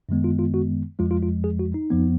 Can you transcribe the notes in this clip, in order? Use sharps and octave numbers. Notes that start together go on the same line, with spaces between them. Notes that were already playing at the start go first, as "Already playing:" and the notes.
F#2 D#3 G#3 B3
F4
F4
F#4
F2 F3 G#3 F4
F4
F4
G#4
F#4
D#4
F2 F3 B3